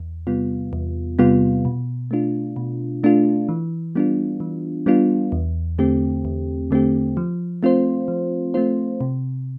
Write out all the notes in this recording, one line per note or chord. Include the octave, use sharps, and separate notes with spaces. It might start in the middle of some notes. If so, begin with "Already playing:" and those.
Already playing: E2
C3 G3 B3 F4
E2
C3 G3 B3 F4
B2
A3 D4 F4
B2
A3 D4 F4
E3
G3 B3 D4 F4
E3
G3 B3 D4 F4
E2
D3 A3 C4 G4
E2
D3 A3 C4 G4
F3
A3 C4 F4 C5
F3
A3 C4 F4 C5
C3